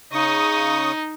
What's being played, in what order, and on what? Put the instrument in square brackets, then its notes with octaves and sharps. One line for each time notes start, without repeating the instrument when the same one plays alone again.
[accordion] C#3 C#6 D#6 [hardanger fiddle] D#4